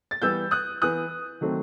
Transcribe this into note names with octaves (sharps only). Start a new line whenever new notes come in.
A6
E3 G3 B3 E6 G6
D#6 F#6
E3 B3 D#6 F#6
D#3 F#3 A3 C4